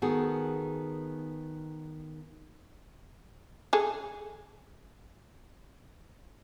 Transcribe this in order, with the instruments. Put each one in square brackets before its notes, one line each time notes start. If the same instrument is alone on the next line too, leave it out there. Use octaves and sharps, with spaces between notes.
[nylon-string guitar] D#3 B3 F#4 G#4 A4
[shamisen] G#4 A4